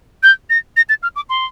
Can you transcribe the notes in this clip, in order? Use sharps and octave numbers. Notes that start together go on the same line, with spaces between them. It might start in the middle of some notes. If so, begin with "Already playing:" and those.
G6
A#6
A#6
A6
F6
D6
C6